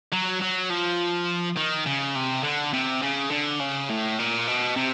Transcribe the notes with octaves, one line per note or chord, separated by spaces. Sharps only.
F#3
F#3
F3
D#3
C#3
C3
D3
C3
C#3
D3
C#3
A2
A#2
B2
C3